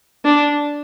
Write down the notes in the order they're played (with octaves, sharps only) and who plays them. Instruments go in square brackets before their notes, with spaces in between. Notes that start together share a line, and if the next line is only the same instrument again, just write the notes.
[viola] D4